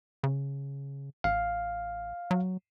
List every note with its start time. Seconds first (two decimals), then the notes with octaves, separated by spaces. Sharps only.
0.24 C#3
1.24 A1 F5
2.31 F#3